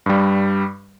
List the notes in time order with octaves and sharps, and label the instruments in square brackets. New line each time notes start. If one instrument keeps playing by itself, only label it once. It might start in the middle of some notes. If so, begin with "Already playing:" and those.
[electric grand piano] G2 G3